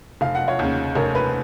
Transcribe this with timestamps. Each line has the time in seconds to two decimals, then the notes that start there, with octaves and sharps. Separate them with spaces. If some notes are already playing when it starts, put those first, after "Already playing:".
0.21 F1 F5
0.35 F#5
0.48 C#5 F5
0.59 D#2 C#3
0.95 F1 A#4 C#5
1.15 B4